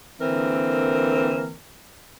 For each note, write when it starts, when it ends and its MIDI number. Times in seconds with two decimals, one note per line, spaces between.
0.21 1.53 50
0.21 1.53 52
0.21 1.53 58
0.21 1.53 60
0.21 1.53 70